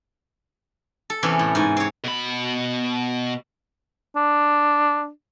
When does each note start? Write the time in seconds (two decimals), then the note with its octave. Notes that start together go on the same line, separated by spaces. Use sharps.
1.10 A4
1.23 E2 C3 E3 C#4
1.39 A2
1.55 G#2 G#5
1.77 C4 C#5
2.04 B2 B5
4.16 D4